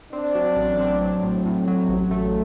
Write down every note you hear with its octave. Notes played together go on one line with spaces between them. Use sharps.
C4 D4
F#3
A1
C4
F#3
A2
A2
F#3
A1
A3